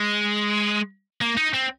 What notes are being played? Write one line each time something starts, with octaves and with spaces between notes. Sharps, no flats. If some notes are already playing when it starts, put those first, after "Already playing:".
Already playing: G#3
A#3
D#4
C4